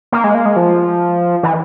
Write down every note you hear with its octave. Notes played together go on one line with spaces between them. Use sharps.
A#3
G#3
A#3
G#3
F3
E3